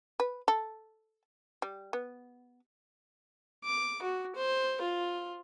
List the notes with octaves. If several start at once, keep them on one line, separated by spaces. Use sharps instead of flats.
B4
A4
G3
B3
D6
F#4
C5
F4